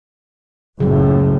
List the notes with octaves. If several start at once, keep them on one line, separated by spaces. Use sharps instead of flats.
F#1 C#2 A2 C#3 F#3